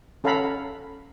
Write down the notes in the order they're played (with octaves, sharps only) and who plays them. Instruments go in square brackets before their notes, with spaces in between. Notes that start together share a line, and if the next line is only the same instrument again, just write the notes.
[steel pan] C#4 A4 F5 F#5 A#5 B5